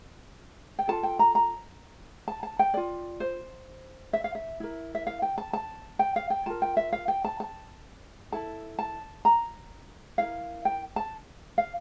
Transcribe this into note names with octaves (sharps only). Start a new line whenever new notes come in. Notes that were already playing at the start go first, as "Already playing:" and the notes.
G5
F4 A4 A5
G5
A#5
A#5
A5
A5
G5
F4 A#4 D5
C5
E5
F5
E5
E4 A#4
E5
F5
G5
A5
A5
G5
F5
G5
F4 A#4 A5
G5
E5
F5
G5
A5
A5
E4 A4 A5
A5
A#5
E4 A#4 F5
G5
A5
F5